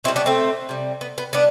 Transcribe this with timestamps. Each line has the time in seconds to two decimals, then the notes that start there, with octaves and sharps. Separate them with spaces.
0.04 B2 C4 E4
0.08 G3
0.16 B3 D4
0.26 A3 C4
0.69 C3 G3
1.01 B3
1.18 B3
1.33 G3 B3 D4